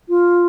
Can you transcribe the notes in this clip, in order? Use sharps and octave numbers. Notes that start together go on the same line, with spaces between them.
F4